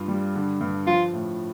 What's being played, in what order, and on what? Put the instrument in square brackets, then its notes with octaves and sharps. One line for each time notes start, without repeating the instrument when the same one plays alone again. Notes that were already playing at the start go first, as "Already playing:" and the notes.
Already playing: [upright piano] G2 F4
G3
D3
G2
[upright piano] F3 [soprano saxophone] F4
[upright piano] A2